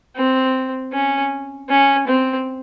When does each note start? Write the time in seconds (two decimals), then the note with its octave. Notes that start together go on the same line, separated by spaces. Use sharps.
0.16 C4
0.93 C#4
1.69 C#4
2.08 C4